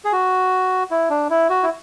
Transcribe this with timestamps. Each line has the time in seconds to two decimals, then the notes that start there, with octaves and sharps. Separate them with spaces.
0.05 G#4
0.12 F#4
0.91 E4
1.10 D4
1.30 E4
1.50 F#4
1.63 E4